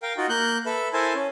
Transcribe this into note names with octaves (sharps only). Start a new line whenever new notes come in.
A#4 F5 G5
D#4 F4 F#4
A#3 F#6 G6
A4 B4 E5
E4 A4 A#4 C5 G#5 A5
C#4